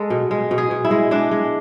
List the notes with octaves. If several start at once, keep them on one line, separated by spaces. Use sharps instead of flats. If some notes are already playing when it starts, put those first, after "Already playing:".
Already playing: G#3 A4
B2
G#3
B2
G#4
B2
E4
G#3
G#3 D4
G#3